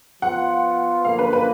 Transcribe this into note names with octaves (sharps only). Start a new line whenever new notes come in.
F3 B3 F4 F#5
F#2 D3 F3 A#3 F5
B4
B4